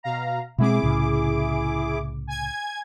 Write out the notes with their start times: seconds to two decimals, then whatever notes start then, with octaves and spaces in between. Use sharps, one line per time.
0.03 B2 F5 A#5
0.58 B2 G#3 C4 E4 G#4 D6
0.83 C2 A2 C#3
2.27 G#5 G#6